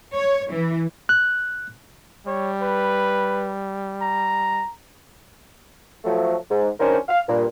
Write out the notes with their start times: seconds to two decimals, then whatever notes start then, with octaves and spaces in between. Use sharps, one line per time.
0.15 C#5
0.52 E3
1.09 F#6
2.27 G3 C#5
2.62 B4
4.01 A#5
6.04 F3 F#3 A3
6.50 G#2
6.80 D#3 F#3 C#4 D4 A#4 C5
7.09 F5
7.29 G2 A#2